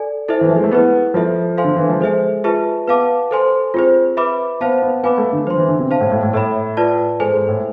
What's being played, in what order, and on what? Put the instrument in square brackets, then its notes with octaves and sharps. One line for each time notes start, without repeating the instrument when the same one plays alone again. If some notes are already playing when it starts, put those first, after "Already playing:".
Already playing: [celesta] A4 D5 G#5
E4 A4 C5 E5
[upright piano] E3
F3
G#3
A3
[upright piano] B3 [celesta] E4 G#4 B4
[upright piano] F3 [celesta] F4 A4 E5
[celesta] A4 C5 F5 G#5 C6
[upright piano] D3
E3
F3
[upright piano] G#3 [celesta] A4 C5 E5 G#5
[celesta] F4 G#4 B4 E5 A5
[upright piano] B3 [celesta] B4 F5 A5 D6
[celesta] A4 C5 G#5 C6
[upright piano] C4 [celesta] F4 G#4 C5
[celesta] B4 E5 B5 D6
[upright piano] B3 [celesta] C5 F5 A5
[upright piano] B3
[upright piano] B3 [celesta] B4 F5 G#5 B5 D6
[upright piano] A3
D3
[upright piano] F3 [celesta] C5 G#5 C6
[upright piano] E3
D3
C3
[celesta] C5 F5 A5
[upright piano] A2
A2
A2
[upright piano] A2 [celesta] A4 E5 B5
[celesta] F4 B4 D5 A5
[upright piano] G#2 [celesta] A4 C5 G#5
[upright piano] G#2
A2